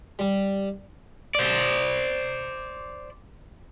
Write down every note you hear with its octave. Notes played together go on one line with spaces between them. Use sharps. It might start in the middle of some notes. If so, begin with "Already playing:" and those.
G3
C5 D5